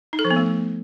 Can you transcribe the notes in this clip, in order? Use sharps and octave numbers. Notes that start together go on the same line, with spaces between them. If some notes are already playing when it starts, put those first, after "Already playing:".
D#4
A4
F3
B3
A3